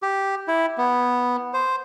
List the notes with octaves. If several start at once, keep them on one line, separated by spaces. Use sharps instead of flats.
G4
E4
B3
C5